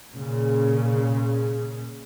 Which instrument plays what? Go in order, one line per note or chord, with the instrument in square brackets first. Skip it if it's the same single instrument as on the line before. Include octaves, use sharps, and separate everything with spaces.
[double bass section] A#2 C#3